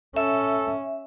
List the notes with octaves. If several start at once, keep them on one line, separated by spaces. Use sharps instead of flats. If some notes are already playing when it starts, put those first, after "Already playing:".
C#4 A4 E5